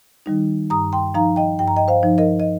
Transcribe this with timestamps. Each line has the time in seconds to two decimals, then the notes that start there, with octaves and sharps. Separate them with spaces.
0.26 D#3 G3 D#4
0.70 G2 A#5 D#6
0.93 G5 C6
1.14 F3 D#4 F5 A#5
1.36 D#5 G5
1.59 G2 G5
1.68 A#5
1.77 D#5 G5
1.88 C5 F5
2.03 F3 D#4
2.18 A#4 D#5
2.40 D#5